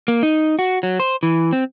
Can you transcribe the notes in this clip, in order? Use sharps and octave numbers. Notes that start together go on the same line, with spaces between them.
A#3
D#4
F#4
F#3
C5
E3
C4